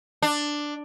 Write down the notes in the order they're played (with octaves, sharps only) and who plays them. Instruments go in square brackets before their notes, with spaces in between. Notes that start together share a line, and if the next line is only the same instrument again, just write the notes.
[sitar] D4